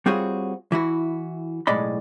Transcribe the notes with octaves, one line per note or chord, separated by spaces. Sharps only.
G3 C4 F4 F#4 G#4 C#5
E3 E4 F#4
B1 A2 G#3 D5 D#5 B5